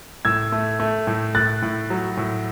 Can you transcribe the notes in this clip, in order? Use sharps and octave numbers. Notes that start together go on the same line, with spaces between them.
A2 E6 G#6
A3
A3
A2
A2 F#6 A6
A2
F#3
A2